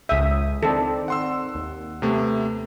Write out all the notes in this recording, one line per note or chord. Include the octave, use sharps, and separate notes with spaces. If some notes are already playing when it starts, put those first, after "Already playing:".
C#2 G#4 E5 D#6
D#3 C4 A4 D5
F#5 C6 E6
D#2
C3 A3 B3